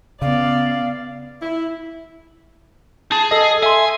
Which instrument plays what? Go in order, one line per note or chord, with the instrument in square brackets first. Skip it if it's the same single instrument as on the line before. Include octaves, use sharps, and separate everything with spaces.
[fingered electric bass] C#3 [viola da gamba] B3 [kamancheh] D5 [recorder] F5
[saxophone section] E4
[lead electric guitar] G#4 [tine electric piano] A5
[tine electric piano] A4 D#5
[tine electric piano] E5 C6 [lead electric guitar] G#5